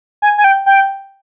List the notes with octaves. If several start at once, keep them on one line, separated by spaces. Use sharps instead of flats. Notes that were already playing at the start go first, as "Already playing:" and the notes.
G#5
G#5
G5
G5